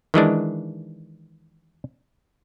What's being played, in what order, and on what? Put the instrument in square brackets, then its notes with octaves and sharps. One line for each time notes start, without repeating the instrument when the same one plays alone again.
[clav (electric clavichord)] D#3 E3 G#3 D4